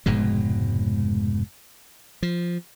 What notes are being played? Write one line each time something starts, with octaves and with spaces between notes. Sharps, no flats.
F1 G#2 B2 G#3
F3